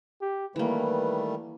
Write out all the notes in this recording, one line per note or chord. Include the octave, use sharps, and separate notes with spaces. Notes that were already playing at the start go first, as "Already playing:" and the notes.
G4
D#3 E3 G3 A3 A#3 B4